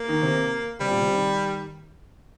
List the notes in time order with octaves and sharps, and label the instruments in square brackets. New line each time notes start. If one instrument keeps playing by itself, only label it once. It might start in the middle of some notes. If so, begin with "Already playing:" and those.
Already playing: [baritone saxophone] A#3
[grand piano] D#3
C3
[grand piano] C3 [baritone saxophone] G3
[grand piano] A#2
C3
D#3